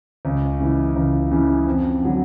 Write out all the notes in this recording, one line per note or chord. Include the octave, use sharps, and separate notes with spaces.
C#2
C#3 E3
C#2
C#3 E3
F2
D3 F#3